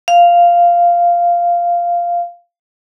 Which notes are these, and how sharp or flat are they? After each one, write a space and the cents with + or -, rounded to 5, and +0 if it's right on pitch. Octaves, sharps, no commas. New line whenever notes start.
F5 -5